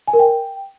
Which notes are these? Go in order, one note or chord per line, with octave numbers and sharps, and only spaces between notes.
G#5
A#4
G5